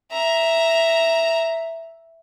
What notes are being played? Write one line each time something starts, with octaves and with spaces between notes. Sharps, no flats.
E5 A#5